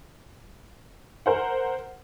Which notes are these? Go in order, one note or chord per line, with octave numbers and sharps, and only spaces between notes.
A#4 C5 F#5